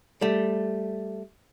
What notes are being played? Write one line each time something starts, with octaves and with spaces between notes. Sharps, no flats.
G3 A3